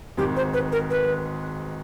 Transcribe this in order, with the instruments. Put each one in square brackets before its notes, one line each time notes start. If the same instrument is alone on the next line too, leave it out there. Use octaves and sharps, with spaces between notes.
[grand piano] G#1 G#2 D#3 [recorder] G4
[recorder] C5
B4
A#4
B4